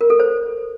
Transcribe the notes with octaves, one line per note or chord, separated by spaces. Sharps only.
A#4
A4
C5